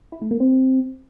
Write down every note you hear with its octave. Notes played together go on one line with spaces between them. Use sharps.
E4
A3
A#3
C4